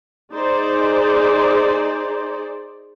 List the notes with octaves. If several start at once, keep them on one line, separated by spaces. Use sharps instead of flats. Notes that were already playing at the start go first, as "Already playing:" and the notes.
D#4 G#4 C5 D5